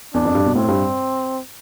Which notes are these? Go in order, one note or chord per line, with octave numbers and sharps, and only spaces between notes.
E2 D4
F2
G2
B2
A2 C4
G2